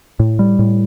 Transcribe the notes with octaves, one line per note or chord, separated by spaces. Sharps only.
A2
G3
A2